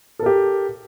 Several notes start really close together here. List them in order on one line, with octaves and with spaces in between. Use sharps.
A4 A#4 G4